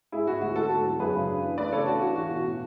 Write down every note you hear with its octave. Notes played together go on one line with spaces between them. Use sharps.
G#2 E4 G#4
G#3 F#4
D2 F#4
D3 F#4 A4
G#2
F#3
F#2 G#4 B4
C#3
D4
E3
A3 B4 D5
C#3 A4 C#5
D4 F#4
E3 F#4
E2 F#4
B2
A2